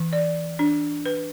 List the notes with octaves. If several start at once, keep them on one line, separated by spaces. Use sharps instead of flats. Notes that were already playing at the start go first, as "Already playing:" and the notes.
Already playing: E3
D5
D4
B4